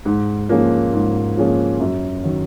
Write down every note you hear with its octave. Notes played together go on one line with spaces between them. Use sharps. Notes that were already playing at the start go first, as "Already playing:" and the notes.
G#2
F3 A#3 C#4 G#4
G#2
F3 A#3 C#4 G#4
F#2
D#3 F#3